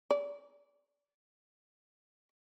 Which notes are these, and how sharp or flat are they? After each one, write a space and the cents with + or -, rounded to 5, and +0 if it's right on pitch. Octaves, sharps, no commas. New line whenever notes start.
D5 -30